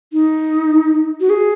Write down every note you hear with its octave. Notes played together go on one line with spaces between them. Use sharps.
D#4
F#4
G#4